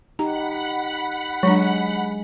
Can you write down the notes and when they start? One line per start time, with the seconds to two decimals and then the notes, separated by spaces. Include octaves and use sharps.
0.19 D#4 G4 F#5 A#5 B5
1.43 F#3 G#3 D4